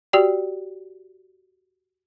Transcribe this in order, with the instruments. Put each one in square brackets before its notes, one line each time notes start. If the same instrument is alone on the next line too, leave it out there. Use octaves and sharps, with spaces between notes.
[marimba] F#4 G4 D5 G5